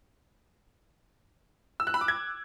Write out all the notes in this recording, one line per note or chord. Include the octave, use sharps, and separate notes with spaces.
E6
F#6
B5
D6
G#6